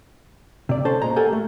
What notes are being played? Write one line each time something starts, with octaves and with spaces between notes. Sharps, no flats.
C3 D5
C#4 A4 C5 A5
A#2 G#3 A#5
G4 A4 A#4 F#5 G#5
A3